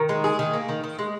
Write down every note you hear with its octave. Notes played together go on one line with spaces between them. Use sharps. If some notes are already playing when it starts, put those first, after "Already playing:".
Already playing: D#3 A#4
G#3
G#4
D#3
A#3
D#3
D#3
G#3